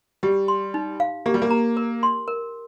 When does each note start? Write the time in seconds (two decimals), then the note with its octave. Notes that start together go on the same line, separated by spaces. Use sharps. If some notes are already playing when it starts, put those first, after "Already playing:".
0.23 G3 G4
0.48 C6
0.74 D#4
1.00 F5
1.26 A#3 G4
1.34 G3
1.42 A#3
1.51 A#5
1.77 A#4
2.03 C6
2.28 A#4